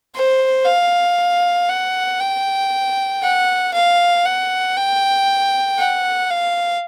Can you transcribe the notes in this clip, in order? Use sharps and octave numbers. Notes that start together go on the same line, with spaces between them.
C5
F5
F#5
G5
F#5
F5
F#5
G5
F#5
F5